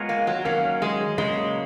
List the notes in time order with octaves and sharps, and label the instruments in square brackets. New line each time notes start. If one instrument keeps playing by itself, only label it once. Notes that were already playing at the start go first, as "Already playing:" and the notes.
Already playing: [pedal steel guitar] G#3 B3 F4 A#4 C#5
[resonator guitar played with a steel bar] A#3
F#3
[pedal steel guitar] D#3 F#3 C#4 [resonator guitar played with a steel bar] A#3
[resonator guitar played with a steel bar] G#3
[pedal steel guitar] C#3 F#3 A#3 [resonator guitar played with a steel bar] G#3